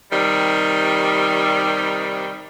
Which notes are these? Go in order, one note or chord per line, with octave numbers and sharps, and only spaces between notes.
C3 D#3 G3